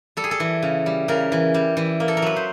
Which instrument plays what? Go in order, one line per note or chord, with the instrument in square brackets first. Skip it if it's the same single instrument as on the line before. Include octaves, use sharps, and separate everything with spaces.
[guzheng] G3 A4
G#4
A4
E3
C#3
G3
C#3 A#4
E3
G3
E3
A#3
A4
A#4
F#3 B4
C5